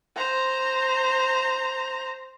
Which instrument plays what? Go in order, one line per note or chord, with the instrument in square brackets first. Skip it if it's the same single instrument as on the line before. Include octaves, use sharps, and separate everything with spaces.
[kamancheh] C5 A#5